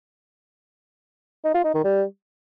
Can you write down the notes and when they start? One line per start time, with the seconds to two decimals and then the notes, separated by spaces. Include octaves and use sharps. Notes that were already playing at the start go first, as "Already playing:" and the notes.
1.45 D#4
1.54 F4
1.64 D#4
1.74 D#3
1.84 G3